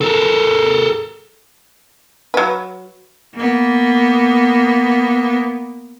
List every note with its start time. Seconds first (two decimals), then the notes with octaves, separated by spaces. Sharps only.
0.01 A4 A#4
2.34 F#3 B4
3.34 A#3 B3